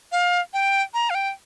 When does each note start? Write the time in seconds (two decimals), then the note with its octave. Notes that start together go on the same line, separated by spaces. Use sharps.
0.12 F5
0.53 G5
0.94 A#5
1.10 F5
1.15 G5